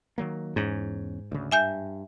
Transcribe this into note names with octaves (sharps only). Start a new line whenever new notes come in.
D#3 F#3 A#3
E2 G#2 C#4
D2 C#3
G2 E5 G#5 G6